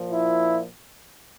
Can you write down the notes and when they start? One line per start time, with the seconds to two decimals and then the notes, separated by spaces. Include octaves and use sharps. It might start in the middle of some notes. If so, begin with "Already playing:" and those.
Already playing: A#2 F3
0.10 E4